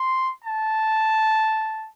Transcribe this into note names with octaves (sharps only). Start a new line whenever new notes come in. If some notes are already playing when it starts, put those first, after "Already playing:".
Already playing: C6
A5